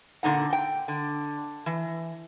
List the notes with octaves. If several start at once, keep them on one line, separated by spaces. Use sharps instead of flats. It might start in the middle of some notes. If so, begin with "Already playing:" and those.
A#2 D3 D#4 F#5
G5
D3
E3